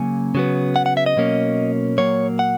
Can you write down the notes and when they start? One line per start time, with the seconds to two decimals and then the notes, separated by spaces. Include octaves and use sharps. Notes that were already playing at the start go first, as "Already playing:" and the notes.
Already playing: C#3 F#3 A#3 C#4 G#5
0.35 C#3 F#3 B3
0.76 F#5
0.86 F#5
0.97 E5
1.06 D#5
1.17 B2 F#3 A#3 C#4
1.98 A#2 F#3 A#3 C#5
2.39 F#5